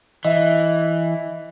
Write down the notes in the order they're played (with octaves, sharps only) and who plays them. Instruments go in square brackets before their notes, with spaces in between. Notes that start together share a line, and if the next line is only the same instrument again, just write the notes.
[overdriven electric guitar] E3 [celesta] D#5 E5